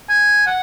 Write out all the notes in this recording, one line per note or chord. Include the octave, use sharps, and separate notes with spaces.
G#5
F#5